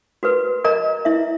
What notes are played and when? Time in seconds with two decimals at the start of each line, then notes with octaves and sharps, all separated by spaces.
0.23 F#4 A#4 B4
0.64 A#4 D#5 A#5
1.05 E4 E5